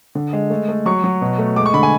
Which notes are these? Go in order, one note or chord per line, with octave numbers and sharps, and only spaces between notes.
D3
G#3
A3
A3
F#3 C#6
F#3
B2
A3
G#3 D6
C#6
D3 B5
G#5